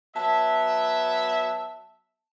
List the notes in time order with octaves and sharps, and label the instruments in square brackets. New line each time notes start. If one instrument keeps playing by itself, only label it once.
[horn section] F#3 B3 E5 [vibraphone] A5